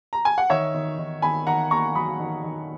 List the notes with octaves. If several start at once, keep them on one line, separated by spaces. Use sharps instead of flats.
A#5
G#5
F#5
D#3 C#5 E5
D#3
D#3
D#3 G#5 B5
D#3 F#5 A#5
A#3 A#5 C#6
F#3 B5 D#6
D#3
D#3